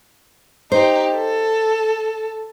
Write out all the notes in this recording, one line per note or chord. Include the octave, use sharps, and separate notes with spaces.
D#4 G4 C5
A4